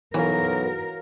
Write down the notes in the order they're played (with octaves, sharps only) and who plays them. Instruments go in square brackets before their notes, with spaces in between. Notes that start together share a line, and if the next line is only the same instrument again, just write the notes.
[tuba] B1 [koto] E3 [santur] F#4 C#5 F5 [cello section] A#4